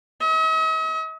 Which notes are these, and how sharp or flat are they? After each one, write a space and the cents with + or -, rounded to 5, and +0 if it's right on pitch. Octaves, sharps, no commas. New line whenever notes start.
D#5 +45